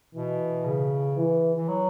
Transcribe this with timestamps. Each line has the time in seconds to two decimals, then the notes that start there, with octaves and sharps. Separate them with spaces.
0.14 B2 E3
0.65 C#3
1.17 E3
1.57 E3
1.68 F#3